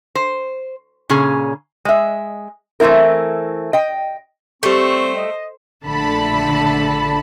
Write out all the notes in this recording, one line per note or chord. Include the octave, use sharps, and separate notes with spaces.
C5
A#2 C#3 C#4 G#4
G#3 E5
E3 A3 C4 E4 A#4
D#5 G5
G3 A3 C4 G4 C5 C#6
D#5
A#1 D3 A3 A5 B5